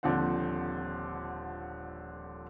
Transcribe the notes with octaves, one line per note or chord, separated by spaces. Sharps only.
D#1 D3 F3 C4 C5 F#5